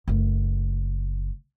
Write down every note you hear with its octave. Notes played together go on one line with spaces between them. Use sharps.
F#1 A3